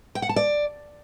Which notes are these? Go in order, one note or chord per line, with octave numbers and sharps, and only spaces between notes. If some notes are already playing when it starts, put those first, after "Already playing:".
G5
F#5
A5
D5